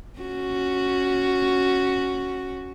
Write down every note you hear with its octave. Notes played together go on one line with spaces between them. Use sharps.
C#4 F#4